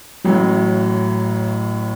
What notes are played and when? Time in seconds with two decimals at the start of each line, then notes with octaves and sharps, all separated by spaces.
0.24 A1 A2 F#3